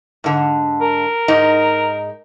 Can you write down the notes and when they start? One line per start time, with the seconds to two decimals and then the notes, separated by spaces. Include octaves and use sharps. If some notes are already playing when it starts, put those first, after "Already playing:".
0.24 G#2 D3
0.81 A#4
1.28 G#2 D#4